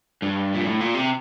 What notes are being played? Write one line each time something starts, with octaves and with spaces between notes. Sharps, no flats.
G2
A#2
A2
A#2
C3